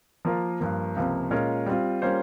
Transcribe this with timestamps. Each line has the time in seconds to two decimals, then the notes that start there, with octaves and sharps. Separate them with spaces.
0.25 F3 A#3 F4 A#4
0.60 G2 F3 A#3
0.96 C#2 C3 F3 A#3
1.31 A#2 G#3 C#4 F4 A#4
1.66 G3 C4 F4
2.02 G3 A#3 C#4 F4 C5